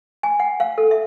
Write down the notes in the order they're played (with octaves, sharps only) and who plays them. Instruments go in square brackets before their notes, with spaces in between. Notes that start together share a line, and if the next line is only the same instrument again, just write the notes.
[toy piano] G#5
F#5
F5
A4
E5